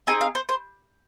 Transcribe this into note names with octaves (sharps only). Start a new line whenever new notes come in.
C4 D#4 G#4 G#5
F5
C5
C5